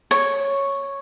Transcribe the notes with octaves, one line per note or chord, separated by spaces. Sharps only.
C#5